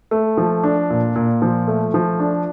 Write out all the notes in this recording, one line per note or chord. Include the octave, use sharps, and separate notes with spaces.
A3
F3
D4
A#2
A#2
F3
A3
F3
D4